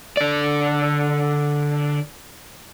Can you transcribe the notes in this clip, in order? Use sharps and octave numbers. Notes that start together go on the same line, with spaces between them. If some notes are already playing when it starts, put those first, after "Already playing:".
D3 D5